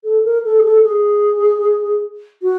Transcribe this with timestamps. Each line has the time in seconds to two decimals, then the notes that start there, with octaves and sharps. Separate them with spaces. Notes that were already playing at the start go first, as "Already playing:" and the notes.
0.04 A4
0.24 A#4
0.44 A4
0.59 G#4
0.63 A4
0.84 G#4
2.42 F#4